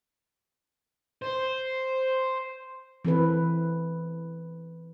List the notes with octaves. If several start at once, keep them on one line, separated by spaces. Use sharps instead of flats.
C5
E3 C4 A4 B4